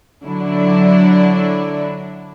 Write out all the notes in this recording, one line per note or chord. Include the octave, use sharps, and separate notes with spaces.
D3 F#3 D4 E4